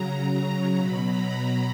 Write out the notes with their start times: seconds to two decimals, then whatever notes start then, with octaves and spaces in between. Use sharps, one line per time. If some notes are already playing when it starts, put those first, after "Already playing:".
Already playing: C#3 F#3 A#5
0.77 B2 F#3 B5
1.06 A#5
1.35 B5